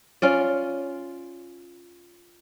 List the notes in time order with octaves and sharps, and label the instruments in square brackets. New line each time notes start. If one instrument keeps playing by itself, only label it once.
[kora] C#4 F4 D5